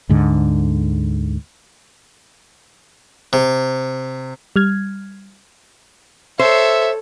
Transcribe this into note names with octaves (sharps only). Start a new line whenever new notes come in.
D2 G#2 D3
C3
G3 F6 G#6
A4 C5 C#5 E5